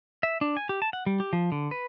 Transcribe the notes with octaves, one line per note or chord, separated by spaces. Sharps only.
E5
D4
G#5
G4
A5
F#5
G3
G4
F3
D3
B4